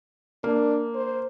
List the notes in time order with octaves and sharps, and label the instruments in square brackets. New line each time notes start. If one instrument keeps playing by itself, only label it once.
[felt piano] A#3 [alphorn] D4
[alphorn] C5